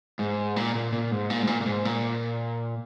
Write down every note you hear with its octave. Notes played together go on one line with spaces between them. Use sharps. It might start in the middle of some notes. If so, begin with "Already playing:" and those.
G#2
A#2
A#2
A#2
G#2
A#2
G#2
A#2
A#2
G#2
A#2